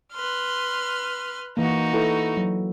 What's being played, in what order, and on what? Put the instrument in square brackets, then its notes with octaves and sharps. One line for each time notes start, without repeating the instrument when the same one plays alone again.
[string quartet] B4 C6 F6
[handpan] E3 A#3 [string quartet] D#4 F#4
[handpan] E4 A4 B4
F#3